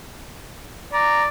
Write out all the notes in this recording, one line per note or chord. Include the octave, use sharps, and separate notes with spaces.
D5 A#5